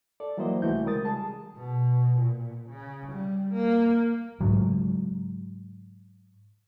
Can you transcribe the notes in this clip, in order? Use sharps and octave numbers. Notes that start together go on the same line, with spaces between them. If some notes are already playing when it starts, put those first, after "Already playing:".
A4 D5
E3 F#3 G3 A#3 C5 D#5
C2 E3 A3 F#4 G6
C#3 G3 G#3 A#4 D#6 A6
G#4 A5
B2
A#2
C#3
G3
A#3
G#2 C#3 F#3